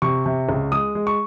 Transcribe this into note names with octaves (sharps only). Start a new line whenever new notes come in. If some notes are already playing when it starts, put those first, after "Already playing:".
C3 C#6
C3
C#2
G#3 D#6
G#3
C#6